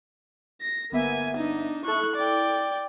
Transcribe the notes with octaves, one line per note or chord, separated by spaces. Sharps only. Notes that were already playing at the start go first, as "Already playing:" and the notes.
A#6
G1 A#3 B3 E5 G#5
D4 D#4
E4 A4 C#6 F#6
D5 G5